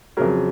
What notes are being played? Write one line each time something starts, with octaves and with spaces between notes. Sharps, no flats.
F2 C#3 F#3 A#4